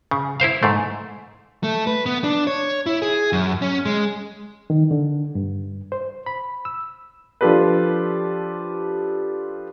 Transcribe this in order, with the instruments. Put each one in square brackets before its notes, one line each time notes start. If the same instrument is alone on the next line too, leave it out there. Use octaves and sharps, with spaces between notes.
[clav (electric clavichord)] C#3
E4 A#4 C5 F5
G#2 A3
[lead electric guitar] A3
B4
B3
D4
C#5
E4
G#4
F#2
C#4
G#3
[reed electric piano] D#3
D3
G2
C5
B5
E6
[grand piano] F3 D4 F4 G4 A4 B4